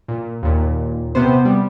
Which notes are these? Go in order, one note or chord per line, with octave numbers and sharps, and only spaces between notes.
A#2
D#2 A#2
C3 B3 C5
G3